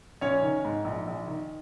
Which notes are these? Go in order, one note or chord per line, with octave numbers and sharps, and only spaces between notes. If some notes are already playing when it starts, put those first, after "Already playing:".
A#1 C#4 C#5
D#3
G#2
A#1
A#1
D#3